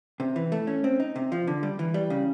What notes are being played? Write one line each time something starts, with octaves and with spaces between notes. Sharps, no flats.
C3
E3
A3
C#4
C4
D#4
C3
F3
D3
G3
E3
G3
C#3